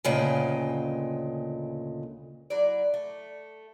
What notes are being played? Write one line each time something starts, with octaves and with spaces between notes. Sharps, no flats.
D2 A#2 C#3 G#3 G5 G#5
F#3 E4 D5
A3